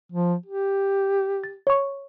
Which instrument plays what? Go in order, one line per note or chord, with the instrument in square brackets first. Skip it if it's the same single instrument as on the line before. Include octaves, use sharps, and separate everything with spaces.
[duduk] F3
G4
[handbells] A6
C#5 C#6